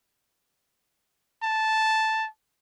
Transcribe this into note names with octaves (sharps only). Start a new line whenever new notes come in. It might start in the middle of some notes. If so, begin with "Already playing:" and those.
A5